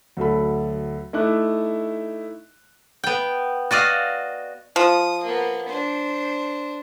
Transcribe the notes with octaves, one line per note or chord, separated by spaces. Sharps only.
D2 F#3 A4 B5
A3 D#4 E4 D6 F#6
B3 G5
F#4 D5 D#5 F5
F3 D#6
A#3 B3
D4 C5